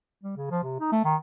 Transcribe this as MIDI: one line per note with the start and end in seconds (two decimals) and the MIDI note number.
0.23 0.35 55
0.37 0.46 49
0.51 0.60 53
0.63 0.76 48
0.80 0.88 63
0.92 1.03 57
1.05 1.16 51